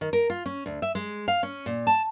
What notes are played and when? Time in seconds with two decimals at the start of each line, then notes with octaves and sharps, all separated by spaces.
0.01 D#3
0.13 A#4
0.30 F4
0.46 C#4
0.66 D2
0.82 E5
0.95 G#3
1.28 F5
1.43 C#4
1.66 A#2
1.87 A5